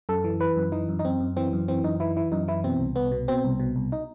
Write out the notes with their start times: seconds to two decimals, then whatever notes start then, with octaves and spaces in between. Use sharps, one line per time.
0.09 F#2 A4
0.24 E3
0.40 E3 B4
0.57 F#2
0.72 E3 D#4
0.89 F#2
0.99 D#4
1.05 F#2 C4
1.20 F#2
1.37 E3 C4
1.53 F#2
1.68 E3 C4
1.84 F#2 D#4
2.00 E3 E4
2.17 E3 E4
2.32 F#2 D#4
2.48 E3 E4
2.64 B2 C4
2.80 C2
2.96 C2 B3
3.12 B2
3.28 B2 C4
3.44 C2
3.60 B2
3.76 C2
3.92 D#4